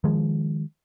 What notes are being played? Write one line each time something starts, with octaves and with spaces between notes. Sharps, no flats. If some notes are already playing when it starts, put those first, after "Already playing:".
D#3 F3 G#3